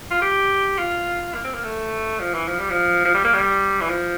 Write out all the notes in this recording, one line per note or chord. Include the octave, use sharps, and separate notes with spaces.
F4
G4
F4
A#3
C4
A#3
A3
F3
E3
F3
G3
F3
F3
G3
A#3
G3
E3
F3